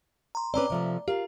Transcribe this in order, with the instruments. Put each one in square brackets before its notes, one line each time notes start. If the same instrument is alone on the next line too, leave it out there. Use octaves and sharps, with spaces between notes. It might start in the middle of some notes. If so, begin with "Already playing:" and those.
[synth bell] A#5 C6
[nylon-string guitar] C4 C#4 B4 [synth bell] D5 A#5 D6
[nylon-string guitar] C3 F3 A3
[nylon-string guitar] F4 A#4 F5 [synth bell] G4